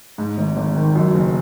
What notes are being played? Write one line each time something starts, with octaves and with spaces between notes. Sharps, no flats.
G#2
G#1
G#1
D#3
F#2
F#1